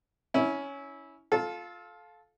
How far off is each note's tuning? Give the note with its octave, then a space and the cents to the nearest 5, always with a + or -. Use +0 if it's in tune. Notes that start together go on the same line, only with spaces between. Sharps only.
C#4 +10 E4 -20
F4 +10 A4 -20